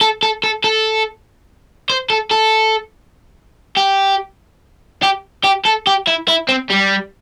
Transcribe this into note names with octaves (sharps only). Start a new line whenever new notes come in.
A4
A4
A4
A4
C5
A4
A4
G4
G4
G4
A4
G4
E4
E4
C4
G3